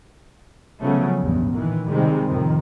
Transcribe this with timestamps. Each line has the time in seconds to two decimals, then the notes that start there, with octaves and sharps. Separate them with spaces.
0.81 C#3 F3 F#3 A3 B3 C#4
1.19 A1 E2 G2
1.51 A#2 D#3 E3
1.88 C3 D#3 G3 G#3 C4
2.29 F2 A2 C3 D#3